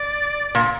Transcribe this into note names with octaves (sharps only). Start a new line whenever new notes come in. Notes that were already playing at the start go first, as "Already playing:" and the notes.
Already playing: D5
A#2